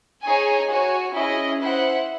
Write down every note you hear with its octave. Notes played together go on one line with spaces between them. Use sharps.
D#4 G#4 C#5 G#5
F#4 C#5 G#5
C#4 E4 G#4 D#5
E4 C5 F#5